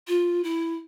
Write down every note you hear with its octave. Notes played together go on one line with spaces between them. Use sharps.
F4
E4